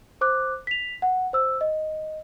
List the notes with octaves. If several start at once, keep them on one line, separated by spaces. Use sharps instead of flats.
C5 D6 F#6
B6 F7
F#5
C5 E6
D#5